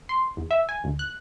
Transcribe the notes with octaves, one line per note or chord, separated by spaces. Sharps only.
C6
E2
E5
G#5
D2
F#6